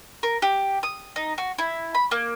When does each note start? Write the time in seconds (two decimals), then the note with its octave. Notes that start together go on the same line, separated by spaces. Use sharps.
0.23 A#4
0.42 G4
0.83 D#6
1.16 D#4
1.38 F#4
1.58 E4
1.95 B5
2.11 A#3